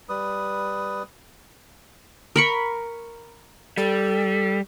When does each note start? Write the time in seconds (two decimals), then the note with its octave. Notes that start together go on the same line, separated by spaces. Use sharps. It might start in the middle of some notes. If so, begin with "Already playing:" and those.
0.09 G3 B4 D#6
2.36 A#4 B5 C#6
3.77 G3 A4